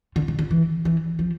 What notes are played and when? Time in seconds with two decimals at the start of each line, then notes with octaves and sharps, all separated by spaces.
0.16 D3
0.28 C3
0.39 D3
0.51 E3
0.85 E3
1.19 F3